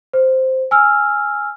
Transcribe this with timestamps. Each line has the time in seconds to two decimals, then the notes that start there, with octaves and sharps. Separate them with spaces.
0.13 C5
0.71 G#5 E6 F6